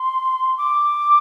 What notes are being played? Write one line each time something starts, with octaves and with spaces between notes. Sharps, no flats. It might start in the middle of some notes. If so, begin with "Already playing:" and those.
Already playing: C6
D6